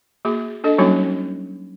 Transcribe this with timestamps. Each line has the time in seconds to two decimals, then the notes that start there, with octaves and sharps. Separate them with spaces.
0.25 A#3 F#4 G#4
0.64 D4 A4 D#5
0.78 F#3 G3 A#3 C#4 D#4 F#4